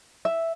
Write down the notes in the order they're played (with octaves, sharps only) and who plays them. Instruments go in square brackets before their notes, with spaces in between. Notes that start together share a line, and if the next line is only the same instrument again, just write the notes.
[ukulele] E5